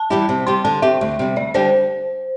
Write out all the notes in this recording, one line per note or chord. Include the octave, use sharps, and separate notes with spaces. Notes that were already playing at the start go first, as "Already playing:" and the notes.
Already playing: A5
E3 G3 E4 G4
C3
G3 C4 G4 C6
D3 A5
C4 G4 E5
D2
C3 G3
D2 D5
D3 G3 D4 G4 C5